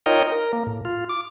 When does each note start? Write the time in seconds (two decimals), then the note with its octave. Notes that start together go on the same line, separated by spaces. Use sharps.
0.06 D#4 F4 A#4 C#5 D#5 G5
0.32 A#4
0.53 A#3
0.67 A2
0.85 F4
1.09 D6